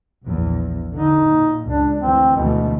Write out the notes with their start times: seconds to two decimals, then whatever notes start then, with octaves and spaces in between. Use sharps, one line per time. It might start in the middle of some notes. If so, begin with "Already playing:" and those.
0.24 A#1 E2
0.93 D3 D#4
1.26 A#2
1.66 C#2 D4
2.01 D2 E3 C4
2.36 D2 B2 E3 A3